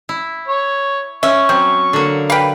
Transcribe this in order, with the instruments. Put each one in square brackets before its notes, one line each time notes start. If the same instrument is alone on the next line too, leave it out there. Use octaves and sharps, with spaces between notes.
[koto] E4
[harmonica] C#5
[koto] C#4 [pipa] E5 [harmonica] C#6
[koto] F#3 [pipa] C4
[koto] D3 A#3
[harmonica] B4 [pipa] F5 G5